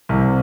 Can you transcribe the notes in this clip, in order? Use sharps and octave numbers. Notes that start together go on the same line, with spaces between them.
C2 C3